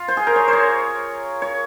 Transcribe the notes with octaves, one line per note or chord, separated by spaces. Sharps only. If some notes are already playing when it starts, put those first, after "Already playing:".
Already playing: F4
C5
G#4
A#4
C#5
C5
C#5
C#5